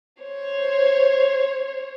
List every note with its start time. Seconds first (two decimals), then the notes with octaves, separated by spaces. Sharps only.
0.23 C5 C#5